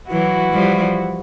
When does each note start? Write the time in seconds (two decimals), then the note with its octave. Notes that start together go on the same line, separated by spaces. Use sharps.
0.12 E3 F#3 E4 F#4
0.53 F3 G3